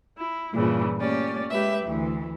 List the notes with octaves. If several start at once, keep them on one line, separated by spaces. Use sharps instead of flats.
E4
G2 A#2 C#3 E3 F3
A3 A#3 C#4 G4 D5
G#3 G4 B4 E5
D2 E3